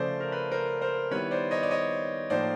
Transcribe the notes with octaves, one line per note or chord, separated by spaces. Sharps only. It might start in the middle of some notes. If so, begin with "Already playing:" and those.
Already playing: C#3 F3 A3 C#4 C5 D5
A#4
B4
A#4 C5
A#4 C5
D#3 G3 B3 E4 B4 C#5
C5 D5
C#5 D#5
D5
C#5 D#5
A2 F3 A#3 D#4 C5 D5